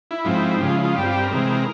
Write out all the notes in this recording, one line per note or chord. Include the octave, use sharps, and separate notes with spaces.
E4
G#2 F3 C4
C#3 F3 G#3 G4
F4
E4
F4
G2 G3 C4 G4
F4
G4
A#4
C3 E3 G#3 C4